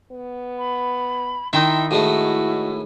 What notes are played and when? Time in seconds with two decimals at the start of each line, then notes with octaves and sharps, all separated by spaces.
0.11 B3
0.58 B5
1.53 D#3 D#4 E4 E5 G5 C6
1.91 A2 G#3 A3 E4 F#4